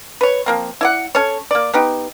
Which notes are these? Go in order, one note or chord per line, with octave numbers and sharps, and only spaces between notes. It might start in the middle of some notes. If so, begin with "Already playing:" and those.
B4 C#5
F3 A#3 C4
E4 D5 F#5
C#4 A4 C#5
A#3 D5
B3 D#4 G4